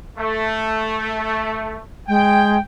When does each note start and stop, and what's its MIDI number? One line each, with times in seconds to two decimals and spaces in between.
0.18 1.77 57
2.08 2.57 56
2.08 2.60 79